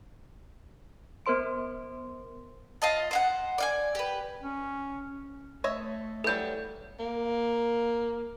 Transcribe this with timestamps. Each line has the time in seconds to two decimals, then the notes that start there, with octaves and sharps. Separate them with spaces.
1.26 B3 A#4 C5 C6 D7
2.82 F4 D#5 A5
3.11 C5 F5 F#5
3.58 D5 F5 G#5
3.95 G4 B4
4.43 C#4
5.64 A3 C#5 D#5 E5
6.24 E3 F#3 G3 A4 G6
6.99 A#3